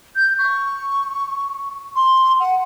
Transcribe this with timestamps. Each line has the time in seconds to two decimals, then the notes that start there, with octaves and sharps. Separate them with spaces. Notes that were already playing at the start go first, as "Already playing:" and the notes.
0.16 G6
0.39 C#6
1.96 C6
2.40 F#5